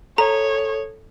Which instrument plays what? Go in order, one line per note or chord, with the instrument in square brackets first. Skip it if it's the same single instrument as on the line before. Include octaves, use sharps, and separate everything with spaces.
[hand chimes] A4 [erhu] C#5 [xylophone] A#5